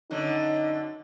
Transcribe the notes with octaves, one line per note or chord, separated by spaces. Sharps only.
F#2 D3 F#3 D#4